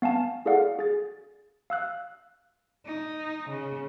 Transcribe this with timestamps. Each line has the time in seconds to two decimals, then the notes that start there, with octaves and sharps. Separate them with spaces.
0.02 B3 F5 G#5 A5
0.45 E4 G#4 A4 D5 F5 F#5
0.79 G#4 A6
1.70 F5 E6 F#6
2.86 D#4
3.49 C#3